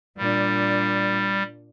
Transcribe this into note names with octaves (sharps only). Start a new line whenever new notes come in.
A#2 G3 D4